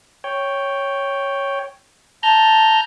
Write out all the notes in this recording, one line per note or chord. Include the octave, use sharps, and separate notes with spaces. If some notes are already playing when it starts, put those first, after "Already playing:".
C#5 G5
A5 A#5 F6 G6